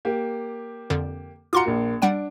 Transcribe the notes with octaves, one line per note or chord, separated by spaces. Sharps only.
A#3 G4
F2 D3
F4 F#4 A#5 C6 D6 C#7
A#1 A#3
G3 D4 F#5 D7